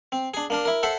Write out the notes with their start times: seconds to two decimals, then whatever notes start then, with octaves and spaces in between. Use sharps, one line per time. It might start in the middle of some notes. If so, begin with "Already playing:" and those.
0.12 C4
0.34 D4 G#4
0.50 A#3 D4 A#4
0.65 E4 A#4
0.83 A4 C5 E5 F#5